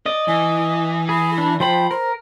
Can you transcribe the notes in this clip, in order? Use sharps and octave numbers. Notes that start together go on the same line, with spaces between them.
D5 D#5
E3 G#5
G#4 B5
D4
F3 C5 G5 B5
A#4 C5